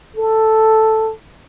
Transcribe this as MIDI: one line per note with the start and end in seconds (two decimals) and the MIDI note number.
0.16 1.11 69